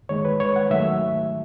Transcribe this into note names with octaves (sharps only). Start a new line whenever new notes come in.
D#3 G#3 C#5
B4
C#5
F#5
D#3 F#3 A3 E5